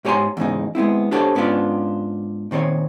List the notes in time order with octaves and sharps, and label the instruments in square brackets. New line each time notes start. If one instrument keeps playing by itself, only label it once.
[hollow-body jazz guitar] G#2 G4 C#5 G#5 A#5 C6
E2 G#2 C#3 D#4
G#3 B3 C4 E4
D4 G4 A4 C5 C#5
G#2 B3 C#4 D4 F4
A#2 D#3 C4 A4 C#5